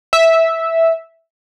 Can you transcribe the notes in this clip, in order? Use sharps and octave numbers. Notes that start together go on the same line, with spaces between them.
E5